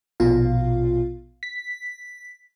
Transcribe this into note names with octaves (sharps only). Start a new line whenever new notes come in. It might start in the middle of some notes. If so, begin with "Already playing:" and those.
A#1 B2 F4 F5
B6